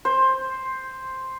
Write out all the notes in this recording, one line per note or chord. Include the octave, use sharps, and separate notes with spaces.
C5